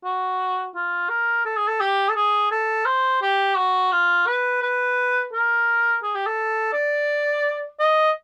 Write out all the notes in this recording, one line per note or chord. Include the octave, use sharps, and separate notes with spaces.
F#4
F4
A#4
A4
G#4
A4
G4
A4
G#4
A4
C5
G4
F#4
F4
B4
B4
A#4
G#4
G4
A4
D5
D#5